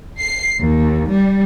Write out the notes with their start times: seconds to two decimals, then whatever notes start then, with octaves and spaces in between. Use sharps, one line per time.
0.20 C7
0.59 D#2
1.11 G3